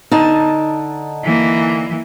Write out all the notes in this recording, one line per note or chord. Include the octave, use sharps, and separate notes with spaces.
D3 D#4 A5
E3 A#3